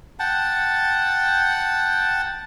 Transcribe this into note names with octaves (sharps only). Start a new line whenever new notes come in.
F#5 G5 A5